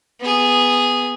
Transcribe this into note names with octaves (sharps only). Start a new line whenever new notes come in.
B3 G#4